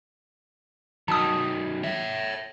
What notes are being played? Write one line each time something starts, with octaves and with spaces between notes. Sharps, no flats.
D#3 F#3 A5 D#6
C#5 E5